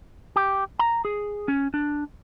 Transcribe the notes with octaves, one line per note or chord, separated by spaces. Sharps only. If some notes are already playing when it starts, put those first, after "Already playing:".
G4
A#5
G#4
C#4
D4